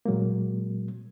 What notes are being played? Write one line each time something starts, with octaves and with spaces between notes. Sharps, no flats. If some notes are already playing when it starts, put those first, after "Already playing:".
A#2 F#3 G#3 A#3